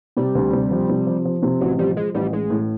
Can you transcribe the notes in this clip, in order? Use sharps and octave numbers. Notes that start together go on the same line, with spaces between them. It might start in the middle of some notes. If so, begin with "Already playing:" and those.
C3 G3
D2
C3
F3
C3
F3
F3
C3
A1 F#3
F3 G3
F3 G#3
A1 G3
A1 G#3
A2